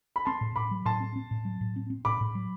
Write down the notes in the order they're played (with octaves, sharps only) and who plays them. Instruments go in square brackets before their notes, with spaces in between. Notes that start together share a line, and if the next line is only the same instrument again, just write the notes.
[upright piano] B5
[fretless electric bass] C4 [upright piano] A5 C6
[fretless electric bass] A2
[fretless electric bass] A2 [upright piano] B5 D6
[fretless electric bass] F#3
[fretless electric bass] A2 [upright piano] A5 C6
[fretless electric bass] C4
C4
A2
F#3
A2
C4
C4
[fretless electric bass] A2 [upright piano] B5 D6
[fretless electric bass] A2
F#3